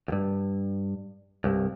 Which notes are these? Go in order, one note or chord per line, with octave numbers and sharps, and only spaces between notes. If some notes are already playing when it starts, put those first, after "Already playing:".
D2 G2
C2 G2